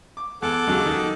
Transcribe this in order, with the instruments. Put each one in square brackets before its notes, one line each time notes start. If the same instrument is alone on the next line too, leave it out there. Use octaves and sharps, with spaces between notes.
[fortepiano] D6
[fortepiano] E2 [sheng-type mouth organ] A4 F#5 D6
[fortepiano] D#2 C#3 F#3
D#3